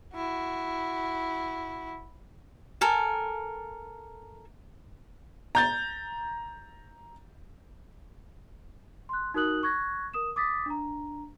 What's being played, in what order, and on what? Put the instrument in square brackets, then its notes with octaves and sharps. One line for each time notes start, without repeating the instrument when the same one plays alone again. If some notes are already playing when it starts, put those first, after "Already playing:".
[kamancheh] E4 F#4
[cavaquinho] A4 A#4 G#5
[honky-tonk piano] A#5 G6 A6
[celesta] C6 F#6
D#4 F#4 A#4 D#6 F#6 F#7
C#6 F#6 G#6 A#6
A#4 D#6 E7
D6 D#6 A6 B6
D4 A#5